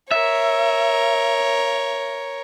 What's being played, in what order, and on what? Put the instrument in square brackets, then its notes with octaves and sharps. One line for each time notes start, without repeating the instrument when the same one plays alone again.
[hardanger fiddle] A#4 C#5 [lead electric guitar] E5